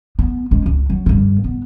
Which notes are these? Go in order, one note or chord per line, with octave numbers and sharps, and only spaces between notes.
B3
G#3 C#4
C#2
F#3
G2 D3
B3